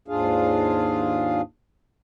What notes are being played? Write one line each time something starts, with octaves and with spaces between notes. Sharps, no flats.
D#2 G#2 D4 F4 G#4 F5